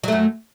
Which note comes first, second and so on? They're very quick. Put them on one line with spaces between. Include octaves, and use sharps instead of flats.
F#3 A3 F#2